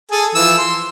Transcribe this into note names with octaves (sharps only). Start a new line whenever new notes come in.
G#4 A4 G#5
E3 F3 E6
C6